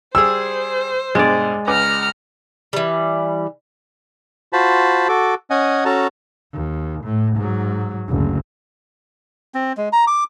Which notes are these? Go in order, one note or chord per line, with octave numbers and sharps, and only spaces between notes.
G3 G#4 C5 E6
G2 B2 G#3 D5
C#2 B4 A#5 D6 F6
E3 G3
F4 F#4 C5 A5 B5
F#4 A4 D6
C#4 D#5 F#5 G#5
C#4 F#4 A4 A5 A#5
D#2
A2
G#2 F#3
F#1 D2
C4
G#3
A#5
D6